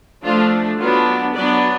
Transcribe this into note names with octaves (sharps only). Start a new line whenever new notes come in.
F3 A3 D4 F4
F#3 B3 D4 F4
F#3 B3 D4 B4 D5